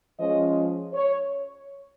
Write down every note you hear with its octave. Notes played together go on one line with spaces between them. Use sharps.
F3 G#3 C#4 D#5
C#5